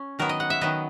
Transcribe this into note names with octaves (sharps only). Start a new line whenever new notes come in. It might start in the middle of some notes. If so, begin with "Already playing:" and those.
Already playing: C#4
D#3 F#3 B3 A#4
D#5
F#5
E5
D#3 F#3 B3 D#5